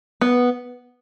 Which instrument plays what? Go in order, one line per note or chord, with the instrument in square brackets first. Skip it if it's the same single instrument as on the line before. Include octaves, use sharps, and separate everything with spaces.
[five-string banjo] B3